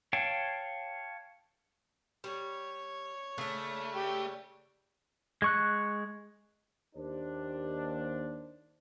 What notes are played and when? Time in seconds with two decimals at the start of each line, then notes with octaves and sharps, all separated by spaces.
0.13 C#5 F5 G5 A5
2.24 G3 C#5
3.38 C#3 A3 D4
3.96 G4
5.42 G#3 C#6 F#6
6.96 D#2 D4 C5